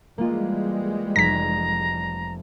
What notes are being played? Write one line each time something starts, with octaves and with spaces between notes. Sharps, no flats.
E3 G3 G#3 A#3 F4
F1 A#5 G#6 A#6 B6